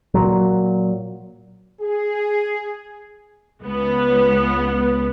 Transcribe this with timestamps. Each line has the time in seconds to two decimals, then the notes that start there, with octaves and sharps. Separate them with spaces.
0.14 A#2 F#3
1.80 G#4
3.62 C#2 B3